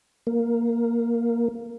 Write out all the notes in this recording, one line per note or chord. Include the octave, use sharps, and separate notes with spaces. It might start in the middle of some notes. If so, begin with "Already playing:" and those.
A#3